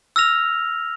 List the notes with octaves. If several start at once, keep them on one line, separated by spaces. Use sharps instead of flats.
E6 F6 A#6 F7